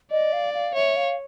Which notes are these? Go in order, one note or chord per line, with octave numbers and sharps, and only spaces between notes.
D5 D#5
F5
F5
C#5 E5
F5